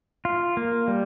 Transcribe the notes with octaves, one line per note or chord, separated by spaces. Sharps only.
F4
A#3
G3